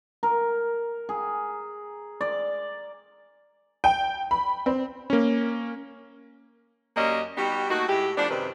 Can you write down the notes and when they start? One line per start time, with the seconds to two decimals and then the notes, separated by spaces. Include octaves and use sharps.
0.23 A#4
1.09 G#4
2.21 D5
3.84 G5
4.31 B5
4.66 C4
5.10 A#3 C#4
6.97 F#2 A#3 C#4 G4 D5 D#5
7.38 G3 B3 D#4 F#4 G4
7.70 A3 A#3 D#4 F#4
7.89 A2 G#3 E4 G4
8.17 F3 A3 B3 D4
8.30 F#2 C3 D#3 C4 G4 B4